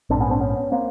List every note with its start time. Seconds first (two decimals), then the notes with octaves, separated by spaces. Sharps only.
0.10 A#1 G#2 C4 D4
0.20 B3 C#4
0.30 C4 D4
0.40 B3 C#4
0.72 A#3 C4